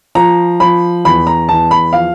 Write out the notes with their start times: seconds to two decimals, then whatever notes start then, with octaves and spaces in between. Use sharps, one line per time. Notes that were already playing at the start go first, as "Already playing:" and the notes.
0.15 F3 A#5
0.60 F3 B5
1.05 E2 B5
1.27 A#5
1.49 E2 A5
1.71 B5
1.93 F3 F5